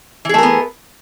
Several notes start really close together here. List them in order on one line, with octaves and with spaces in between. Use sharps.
E3 G#4 A3 A#4 B3